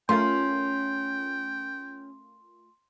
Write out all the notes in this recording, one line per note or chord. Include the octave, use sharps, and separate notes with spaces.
A3 C#4 F4 A#4 G5 C6